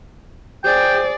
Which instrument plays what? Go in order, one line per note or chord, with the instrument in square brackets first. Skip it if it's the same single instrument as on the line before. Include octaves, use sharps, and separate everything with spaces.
[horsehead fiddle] G#4 D5 [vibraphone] C5 [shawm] G5